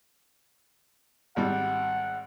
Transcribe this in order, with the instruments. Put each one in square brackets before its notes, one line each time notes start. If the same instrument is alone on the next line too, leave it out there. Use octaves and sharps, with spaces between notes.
[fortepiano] G#1 G3 [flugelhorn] F#5